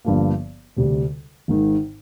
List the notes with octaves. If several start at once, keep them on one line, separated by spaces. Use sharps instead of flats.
G1 G2 D3 F3 A#3
D2 C3 G3
G#1 G#2 D#3